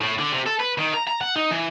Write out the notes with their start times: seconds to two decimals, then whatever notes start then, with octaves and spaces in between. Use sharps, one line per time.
0.01 A2
0.18 D3
0.32 C3
0.46 A4
0.60 B4
0.78 D#3
0.94 A#5
1.08 A#5
1.21 F#5
1.36 D#4
1.51 E3